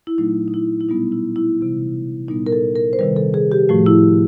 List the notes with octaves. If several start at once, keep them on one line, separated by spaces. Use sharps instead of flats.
E4
A#2 F#3 A3 D#4
D#4
E4
E4
B2 G3 B3 D#4
E4
E4
C3 E3 G3
A#2 G3 B3 D#4
A#4
A4
A#4
C5
C3 D#3 G3 B4
A4
G#4
G4
A2 F3 A3 F#4
E4